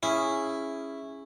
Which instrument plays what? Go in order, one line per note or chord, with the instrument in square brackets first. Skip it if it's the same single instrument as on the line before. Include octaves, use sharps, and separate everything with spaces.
[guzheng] C#4 G#4 F5 [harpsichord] E4